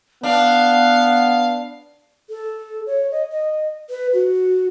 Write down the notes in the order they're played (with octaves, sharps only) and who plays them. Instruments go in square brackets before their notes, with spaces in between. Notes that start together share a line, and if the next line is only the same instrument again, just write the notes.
[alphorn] B3 [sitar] D4 [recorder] F5 [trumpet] F#5
[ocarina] A4
C#5
D#5
D#5
B4
F#4